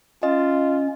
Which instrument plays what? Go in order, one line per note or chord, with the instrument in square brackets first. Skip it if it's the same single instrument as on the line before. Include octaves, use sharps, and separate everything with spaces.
[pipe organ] C#4 [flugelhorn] F4 [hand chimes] D#5